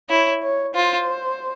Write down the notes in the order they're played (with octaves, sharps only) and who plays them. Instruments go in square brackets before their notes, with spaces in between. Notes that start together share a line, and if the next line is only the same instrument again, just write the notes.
[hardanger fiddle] E4 [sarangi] C#5
[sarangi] C#5
[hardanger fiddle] F4 [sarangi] C5